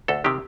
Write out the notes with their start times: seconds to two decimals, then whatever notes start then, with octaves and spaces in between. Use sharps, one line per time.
0.08 D2 A4
0.24 C3 D#3 G4